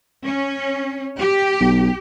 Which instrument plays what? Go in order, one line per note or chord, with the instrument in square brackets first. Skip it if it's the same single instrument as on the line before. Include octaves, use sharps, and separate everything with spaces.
[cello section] C#4
G4
[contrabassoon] B1